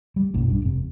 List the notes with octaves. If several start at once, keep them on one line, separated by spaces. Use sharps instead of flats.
G3
B1 F#2 A#2
G2
F1 C3